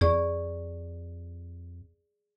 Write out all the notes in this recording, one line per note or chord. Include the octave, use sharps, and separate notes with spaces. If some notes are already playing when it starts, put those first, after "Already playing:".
F2 G#4 D5 C#6